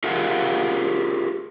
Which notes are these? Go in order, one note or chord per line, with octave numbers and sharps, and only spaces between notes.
F4 G4 G#4 A#4 F5 F#5